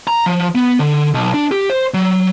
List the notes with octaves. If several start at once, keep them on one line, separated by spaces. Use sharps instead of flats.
A#5
F3
B3
D3
B1
D4
G4
C5
F#3